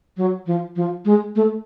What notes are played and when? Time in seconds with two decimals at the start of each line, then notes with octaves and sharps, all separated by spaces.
0.17 F#3
0.46 F3
0.76 F3
1.05 G#3
1.36 A3